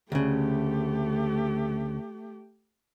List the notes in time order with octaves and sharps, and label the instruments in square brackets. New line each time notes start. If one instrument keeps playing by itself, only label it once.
[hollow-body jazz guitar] D2 C#3 [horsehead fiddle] A3 G4